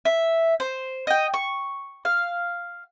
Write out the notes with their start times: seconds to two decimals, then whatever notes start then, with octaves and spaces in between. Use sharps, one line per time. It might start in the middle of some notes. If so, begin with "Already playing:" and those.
0.05 E5
0.60 C5
1.07 D#5 G5
1.34 C#6
2.05 F5